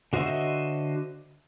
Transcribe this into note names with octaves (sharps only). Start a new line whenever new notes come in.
D3 F#4 C5 D#5 E5